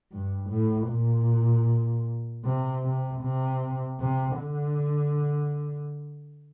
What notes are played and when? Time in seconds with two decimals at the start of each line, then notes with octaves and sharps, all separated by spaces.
0.12 G2
0.50 A2
0.90 A#2
2.44 C3
2.84 C3
3.22 C3
4.00 C3
4.39 D3